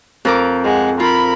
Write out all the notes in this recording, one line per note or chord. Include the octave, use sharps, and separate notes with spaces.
F2 A#4 D6
G#3 F#5
F4 A#4 B5